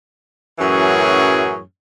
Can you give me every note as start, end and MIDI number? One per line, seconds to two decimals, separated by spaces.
0.59 1.60 42
0.59 1.60 45
0.59 1.60 52
0.59 1.60 54
0.59 1.60 61
0.59 1.60 68